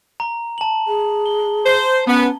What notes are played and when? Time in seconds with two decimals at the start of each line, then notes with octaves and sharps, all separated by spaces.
0.20 A#5
0.58 A5 F#7
0.88 G#4
1.26 G7
1.65 C5
2.07 B3 C#4